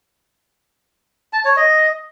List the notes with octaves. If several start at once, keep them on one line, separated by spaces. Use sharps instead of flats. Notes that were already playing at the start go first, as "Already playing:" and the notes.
A5
C#5
D#5